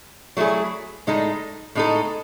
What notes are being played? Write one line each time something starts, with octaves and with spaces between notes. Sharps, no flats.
F#3 A3 E4 G#4
A2 G#3 D#4 A4
A2 G#3 D#4 A4